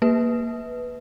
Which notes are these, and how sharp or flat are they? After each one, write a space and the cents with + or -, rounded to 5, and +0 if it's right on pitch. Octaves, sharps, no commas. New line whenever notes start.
A#3 +0 B4 +0